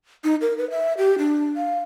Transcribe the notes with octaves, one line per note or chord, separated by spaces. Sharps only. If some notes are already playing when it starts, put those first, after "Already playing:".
D#4
A#4
B4
E5
G4
D4
F5